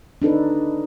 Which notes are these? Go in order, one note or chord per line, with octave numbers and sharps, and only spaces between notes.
D4 D#4 A4 B4